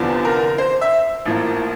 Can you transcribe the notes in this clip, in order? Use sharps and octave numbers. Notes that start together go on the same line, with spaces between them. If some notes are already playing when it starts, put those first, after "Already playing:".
Already playing: F1 E2 D3 F3
A#4
C5
E5
A1 A2 F3 A#3